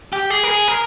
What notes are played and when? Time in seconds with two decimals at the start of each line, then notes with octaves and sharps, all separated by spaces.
0.13 G4
0.30 G#4
0.44 A#4
0.49 G#4
0.68 A#4